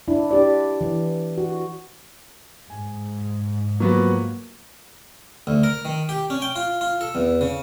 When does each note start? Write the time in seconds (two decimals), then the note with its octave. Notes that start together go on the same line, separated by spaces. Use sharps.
0.08 D4 E4
0.31 D4 G4 D5
0.81 E3
1.38 F#4
2.70 G#2 G#5
3.80 F3 F#3 A#3 B3 F#4
5.47 D2
5.64 A#4
5.85 D#3
6.09 G4
6.30 C#4
6.42 G5
6.56 F4
6.81 F4
7.01 A4
7.15 E2
7.41 C#3